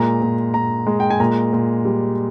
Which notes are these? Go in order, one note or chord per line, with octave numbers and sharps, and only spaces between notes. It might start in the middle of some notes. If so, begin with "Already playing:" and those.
Already playing: A#2 G#3 A#5
A#2
A#2 A#5
G#3
G5
G#5
A#2 A#5
A#2
G3